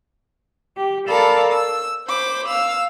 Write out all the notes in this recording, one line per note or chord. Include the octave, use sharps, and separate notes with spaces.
G4
A4 A#4 D5 F5 A5 B5
E6
C5 B5 D6
F5 E6